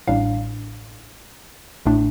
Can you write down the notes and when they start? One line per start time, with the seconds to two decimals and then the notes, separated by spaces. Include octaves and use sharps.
0.07 A1 A2 G3 D4 F5
1.86 A1 A2 A3 D4